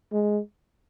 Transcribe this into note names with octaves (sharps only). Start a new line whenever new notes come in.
G#3